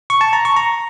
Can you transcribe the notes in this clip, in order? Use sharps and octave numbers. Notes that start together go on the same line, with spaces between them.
C#6
A5
A#5
C#6
A#5